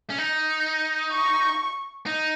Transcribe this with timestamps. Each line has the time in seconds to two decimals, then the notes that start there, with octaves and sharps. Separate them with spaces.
0.10 C#4
0.18 D#4
1.12 C#6
2.06 D#4